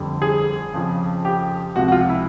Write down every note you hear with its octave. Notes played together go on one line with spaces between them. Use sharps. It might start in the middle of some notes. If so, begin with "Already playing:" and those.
Already playing: F1 F2 D3 G3
G#4
F2 C#3 F3
G4
C#2 C3 F3 F#4
F#4
F4
E4